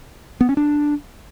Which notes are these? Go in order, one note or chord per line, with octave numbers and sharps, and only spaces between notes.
B3
C#4
D4